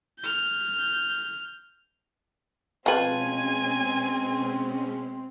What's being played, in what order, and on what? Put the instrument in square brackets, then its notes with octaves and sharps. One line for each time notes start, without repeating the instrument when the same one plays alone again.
[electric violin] F6 G6
[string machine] B2 G#3 C#4 [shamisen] F3 B4 [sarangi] C4 [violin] G#5